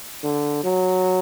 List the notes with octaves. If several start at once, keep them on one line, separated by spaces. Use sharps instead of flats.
D3
F#3